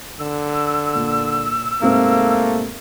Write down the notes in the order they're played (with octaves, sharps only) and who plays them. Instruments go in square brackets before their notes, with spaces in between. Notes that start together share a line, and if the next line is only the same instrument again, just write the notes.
[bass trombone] D3 [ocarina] E6
[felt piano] A#2
[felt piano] G#2 C3 C4 [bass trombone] A3 [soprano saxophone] A#3